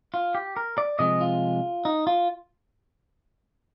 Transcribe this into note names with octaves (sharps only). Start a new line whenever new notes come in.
F4
G4
A#4
D5
C3 F3 G#3 D#5
F4
D#4
F4